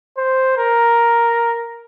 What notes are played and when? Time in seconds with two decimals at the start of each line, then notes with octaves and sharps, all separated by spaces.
0.17 C5
0.58 A#4